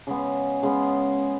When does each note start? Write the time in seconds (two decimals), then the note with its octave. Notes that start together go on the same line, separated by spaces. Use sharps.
0.07 C#3 G#3 B3
0.63 C#3 G#3 B3